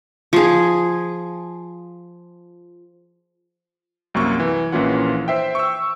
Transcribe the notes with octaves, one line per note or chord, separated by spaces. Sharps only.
F3 G#4
C2 F#2 A#3 C#6
E3
A#1 E3 A#3 C#4 F4 F#5
C5 E5 G5
C#6 E6